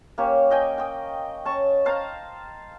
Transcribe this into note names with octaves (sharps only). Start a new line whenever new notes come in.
A#3 C#4 G4 C#5
D#5 G5 G#5
G5 D#6
C#4 A5 C#6
C5 F5 A5 A#5